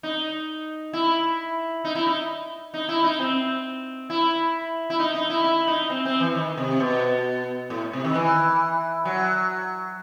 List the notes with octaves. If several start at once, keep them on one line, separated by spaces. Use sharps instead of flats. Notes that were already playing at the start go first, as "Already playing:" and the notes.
D#4
E4
D#4
E4
D#4
D#4
E4
D#4
C4
E4
E4
D#4
D#4
E4
E4
D#4
C4
C4
E3
D#3
C3
B2
A2
C3
D#3
E3
F#3